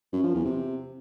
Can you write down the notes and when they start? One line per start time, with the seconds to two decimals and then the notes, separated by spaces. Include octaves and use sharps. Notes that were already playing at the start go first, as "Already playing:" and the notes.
0.13 F#2
0.23 F3
0.34 E2
0.45 C3